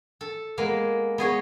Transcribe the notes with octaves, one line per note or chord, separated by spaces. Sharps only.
A4
G#3 A#3 B3
B3 G#4 C#5 D#5